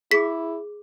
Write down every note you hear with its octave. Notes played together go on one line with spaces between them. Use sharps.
E4 G#4 D6 B6